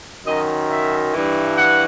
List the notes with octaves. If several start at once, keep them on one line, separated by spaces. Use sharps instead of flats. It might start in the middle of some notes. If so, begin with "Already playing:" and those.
F#2 D#3 F#3 D#5
E5
G2 E3
F#5